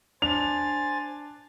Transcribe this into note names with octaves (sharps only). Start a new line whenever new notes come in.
D4 C5 G#5 A6 F7